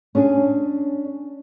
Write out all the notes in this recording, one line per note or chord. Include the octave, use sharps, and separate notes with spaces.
C#4 D4 G#4